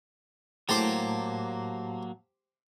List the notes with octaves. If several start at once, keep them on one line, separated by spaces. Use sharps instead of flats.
A2 F#3 A#3 G4 C5 A5 D6